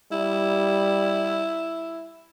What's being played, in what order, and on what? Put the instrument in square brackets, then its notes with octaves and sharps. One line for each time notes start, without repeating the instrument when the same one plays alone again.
[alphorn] G3 [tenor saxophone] E4